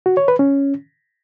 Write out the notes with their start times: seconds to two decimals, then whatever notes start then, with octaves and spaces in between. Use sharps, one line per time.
0.06 F#4
0.17 C#5
0.28 B4
0.39 C#4